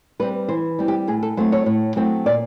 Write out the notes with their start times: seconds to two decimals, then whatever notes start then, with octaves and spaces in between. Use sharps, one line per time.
0.19 G3 C4 B4
0.48 E3 C5
0.79 G3 C4
0.88 G4
1.07 A2 G#4
1.23 A4
1.37 F#3 A3 C4 C5
1.52 C#5
1.66 A2
1.96 F#3 A3 C4
2.26 A#2 D5